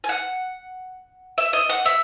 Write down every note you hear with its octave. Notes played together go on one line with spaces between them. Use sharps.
G#5
F#5
E5
D#5
F#5
E5